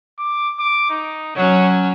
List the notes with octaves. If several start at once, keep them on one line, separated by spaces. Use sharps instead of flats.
D6
D6
D#4
F#3 C#4 C#5